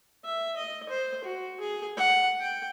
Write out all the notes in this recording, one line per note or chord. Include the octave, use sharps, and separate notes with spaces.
E5
D#5
C5
F#4
G#4
F#5
G5